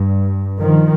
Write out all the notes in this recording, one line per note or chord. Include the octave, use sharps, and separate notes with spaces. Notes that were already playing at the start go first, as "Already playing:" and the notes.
Already playing: G2
D#3 F3